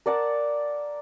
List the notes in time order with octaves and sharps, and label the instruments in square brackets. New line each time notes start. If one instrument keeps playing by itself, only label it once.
[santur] A#4 D5 F#5 A5